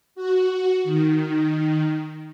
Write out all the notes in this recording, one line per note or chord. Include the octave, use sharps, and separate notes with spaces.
F#4
D#3